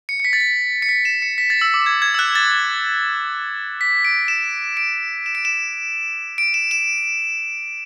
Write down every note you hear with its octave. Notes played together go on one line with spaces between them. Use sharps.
C#7
C#7
B6
A6
B6
C#7
B6
E7
C#7
B6
A6
E6
D6
G#6
G#6
E6
F#6
A6
B6
D7
E7
D7
E7
D7
E7
D7
E7
E7